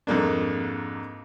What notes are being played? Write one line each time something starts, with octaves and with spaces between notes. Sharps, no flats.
F2 G#2 A#3 D4